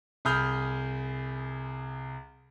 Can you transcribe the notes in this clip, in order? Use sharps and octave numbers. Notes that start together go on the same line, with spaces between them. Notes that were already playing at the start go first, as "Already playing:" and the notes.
C2 G#4 B5 D#6 F6 G6